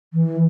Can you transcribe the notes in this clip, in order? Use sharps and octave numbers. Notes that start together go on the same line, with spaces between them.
E3